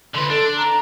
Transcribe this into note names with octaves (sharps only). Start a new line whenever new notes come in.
D3 B4 C6
D4 A4
A#5